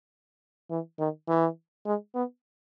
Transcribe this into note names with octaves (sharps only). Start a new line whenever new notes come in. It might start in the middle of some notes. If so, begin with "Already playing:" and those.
E3
D#3
E3
G#3
B3